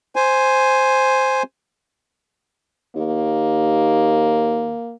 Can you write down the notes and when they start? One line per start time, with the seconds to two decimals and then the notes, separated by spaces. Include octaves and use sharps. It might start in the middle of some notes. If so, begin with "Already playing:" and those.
0.16 C5 G#5
2.96 D#2 A#3